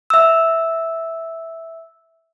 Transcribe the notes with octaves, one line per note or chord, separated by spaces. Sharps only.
E5 E6